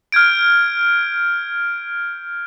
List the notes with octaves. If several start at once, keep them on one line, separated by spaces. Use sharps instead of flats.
F6 G6 G#6 D7